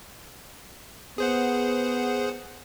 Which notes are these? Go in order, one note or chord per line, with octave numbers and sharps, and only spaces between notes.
B3 G#4 C5 F#5